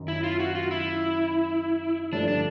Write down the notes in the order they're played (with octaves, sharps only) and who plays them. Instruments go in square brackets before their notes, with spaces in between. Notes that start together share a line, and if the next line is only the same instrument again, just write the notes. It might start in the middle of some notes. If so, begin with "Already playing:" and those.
Already playing: [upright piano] F#2 D#3 F#3
[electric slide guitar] E4
F4
F#4
F4
E4
[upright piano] G2 D3 F3 A3 [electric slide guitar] D4
[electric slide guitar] D4